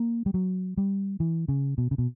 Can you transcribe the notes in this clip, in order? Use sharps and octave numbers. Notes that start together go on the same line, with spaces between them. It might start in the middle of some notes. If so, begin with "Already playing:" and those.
Already playing: A#3
G3
F#3
G3
E3
C#3
B2
C#3
B2